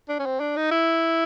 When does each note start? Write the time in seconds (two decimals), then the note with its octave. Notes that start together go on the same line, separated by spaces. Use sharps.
0.09 D4
0.19 C#4
0.26 C4
0.40 D4
0.57 D#4
0.71 E4